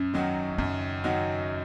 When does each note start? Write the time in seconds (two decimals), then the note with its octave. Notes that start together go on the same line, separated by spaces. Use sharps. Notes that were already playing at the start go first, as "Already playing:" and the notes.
Already playing: F#2 C#4
0.14 D#3 F#3 D#4 F#4
0.58 F#2 C#3
1.04 D#3 F#3 D#4 F#4